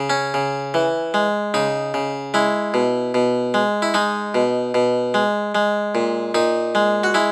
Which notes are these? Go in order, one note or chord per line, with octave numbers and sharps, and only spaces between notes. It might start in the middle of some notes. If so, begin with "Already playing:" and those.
Already playing: C#3
C#4
C#3
E3
G#3
C#3 D#4
C#3
G#3 E4
B2
B2
G#3
E4
G#3 D#4
B2
B2
G#3
G#3
A#2
A#2 D#4
G#3
F#4
G#3 E4